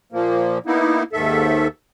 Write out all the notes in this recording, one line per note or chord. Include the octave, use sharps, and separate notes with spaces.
A#2 F3 A#3
A#3 B3 D#4 E4
D#2 G#2 D#3 A4 E5